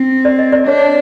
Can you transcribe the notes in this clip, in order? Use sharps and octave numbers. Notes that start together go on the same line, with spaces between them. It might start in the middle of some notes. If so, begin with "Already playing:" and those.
Already playing: C4
D5
D#5
D5
D4 C#5